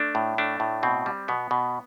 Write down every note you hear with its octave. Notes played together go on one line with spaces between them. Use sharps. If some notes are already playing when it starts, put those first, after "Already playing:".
Already playing: A3 D4
A2
A3 D4
A2
B2 C4
G3
B2 B3
B2